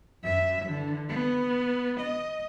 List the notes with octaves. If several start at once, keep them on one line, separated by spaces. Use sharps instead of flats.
F#2 E5
D3 E3
B3
D#5